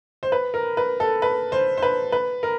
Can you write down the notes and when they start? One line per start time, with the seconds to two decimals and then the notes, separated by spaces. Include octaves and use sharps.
0.23 C5
0.32 B4
0.54 A#4
0.77 B4
1.00 A4
1.22 B4
1.52 C5
1.77 C5
1.83 B4
2.12 B4
2.43 A#4